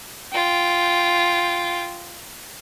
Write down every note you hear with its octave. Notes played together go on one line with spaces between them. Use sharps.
F4 G5